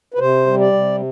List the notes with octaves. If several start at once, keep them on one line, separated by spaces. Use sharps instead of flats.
B4
C3 C5
G3
D5
C3